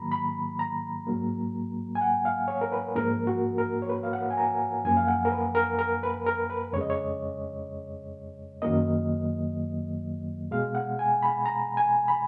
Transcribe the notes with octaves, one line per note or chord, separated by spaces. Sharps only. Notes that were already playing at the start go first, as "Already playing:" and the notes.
Already playing: G#2 D#3 F#3 A#3 A#5 B5
B5
A#5
G#2 F#3 A#3
G#5
F#5
F5
C#5
A#4
B4
G#2 F3 A#3 A#4
F#4
A#4
C#5
B4
F5
F#5
G#5
A#5
F#2 F3 A#3 G#5
F5
F#5
A#4
B4
A#4
A#4
B4
A#4
B4
F2 C#3 G#3 C#5
D#5
C#5
F#2 D#3 F#3 A#3 D#5
B2 G#3 F5
F#5
G#5
B5
A#5
G#5
B5